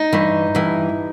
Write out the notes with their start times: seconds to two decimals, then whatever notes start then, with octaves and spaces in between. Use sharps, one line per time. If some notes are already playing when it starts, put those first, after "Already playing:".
Already playing: D#4
0.13 G2 E3
0.55 G2 E3